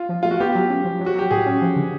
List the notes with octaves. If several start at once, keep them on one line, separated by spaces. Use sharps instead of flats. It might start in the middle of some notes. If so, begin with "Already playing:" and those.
Already playing: F4
F3
A3 F4
F#4
B3 G4
F#3
C#4
F3
F#3
F#4
F#3 G4
A2 G#4
C#4
F3
D3